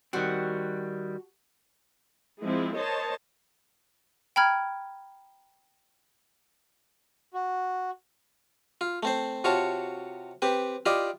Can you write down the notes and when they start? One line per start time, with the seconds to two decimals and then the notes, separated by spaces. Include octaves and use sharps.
0.13 D#3 G3 C4 F#4 F#5 A5
2.42 F3 G#3 C4 E4
2.77 A#4 C5 C#5 D#5 A5
4.36 G5 A#5 B5 F6 G#6
7.34 F#4
8.81 F4
9.03 A3 C4 C5
9.44 C3 F4 F#4 C#5 A5
10.42 C4 G4 B4
10.86 E4 F4 G4 D5 D#5